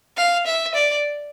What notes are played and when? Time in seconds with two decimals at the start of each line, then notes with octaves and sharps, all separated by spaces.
0.17 F5
0.46 E5
0.74 D5